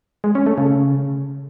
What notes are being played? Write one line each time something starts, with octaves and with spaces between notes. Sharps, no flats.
G#3
C#4
A3
C#3